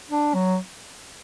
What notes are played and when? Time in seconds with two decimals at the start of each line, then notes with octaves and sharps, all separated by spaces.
0.11 D4
0.35 F#3